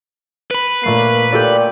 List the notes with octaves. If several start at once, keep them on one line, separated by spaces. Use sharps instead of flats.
B4 B5
A#2 A3 A#3 C7
A#2 G4 A4 D5